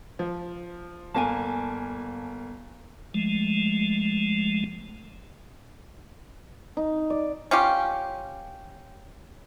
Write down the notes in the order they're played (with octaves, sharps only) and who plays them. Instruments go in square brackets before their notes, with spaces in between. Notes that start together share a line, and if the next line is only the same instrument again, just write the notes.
[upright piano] F3
[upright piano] G1 A#3 [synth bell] G#5 A5
[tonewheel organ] F3 G#3 A3
[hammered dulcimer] D#4
D5
[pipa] C#4 F4 G4